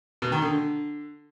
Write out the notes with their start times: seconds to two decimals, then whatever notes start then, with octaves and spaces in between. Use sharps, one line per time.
0.22 B2
0.32 D#3
0.42 D3